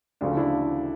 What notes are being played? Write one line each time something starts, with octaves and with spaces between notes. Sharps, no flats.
D2 C#3 F3 A3 D4
D4 E4